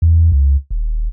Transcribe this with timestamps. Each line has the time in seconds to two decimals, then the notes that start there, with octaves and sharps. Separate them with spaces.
0.02 E2
0.32 C#2
0.70 D#1